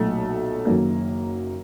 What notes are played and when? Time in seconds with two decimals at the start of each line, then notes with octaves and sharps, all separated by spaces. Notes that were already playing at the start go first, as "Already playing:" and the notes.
Already playing: B1 A#2 F#3 A3
0.65 F#1 F#2 D#3 F#3 A#3